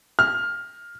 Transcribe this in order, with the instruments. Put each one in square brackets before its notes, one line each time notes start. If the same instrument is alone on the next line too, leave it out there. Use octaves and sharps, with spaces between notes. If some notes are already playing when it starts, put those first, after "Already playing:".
[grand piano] F6